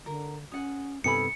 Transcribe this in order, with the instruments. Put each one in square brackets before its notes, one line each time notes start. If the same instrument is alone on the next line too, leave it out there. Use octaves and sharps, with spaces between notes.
[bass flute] D3 [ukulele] A#4
[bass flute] C#4 [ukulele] G#4 F#5
[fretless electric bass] G2 C3 B3 [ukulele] D#4 G#5 B5 [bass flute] A4 [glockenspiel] C#7